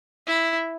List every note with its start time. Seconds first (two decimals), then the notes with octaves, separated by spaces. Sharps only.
0.27 E4